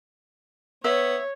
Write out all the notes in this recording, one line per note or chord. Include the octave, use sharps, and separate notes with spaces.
B3 C#5 E5